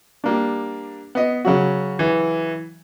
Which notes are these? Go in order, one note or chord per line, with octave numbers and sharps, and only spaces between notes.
G3 A#3 D4
B3 D#5
C#3 F#3 F#4
E3